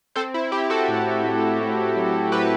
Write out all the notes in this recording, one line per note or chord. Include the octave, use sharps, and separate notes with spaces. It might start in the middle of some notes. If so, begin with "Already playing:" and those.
C4 A4 C5
E4
C4 E4 G4
F#4 A4
A2
A2
A2
F#3
F#3 G4 B4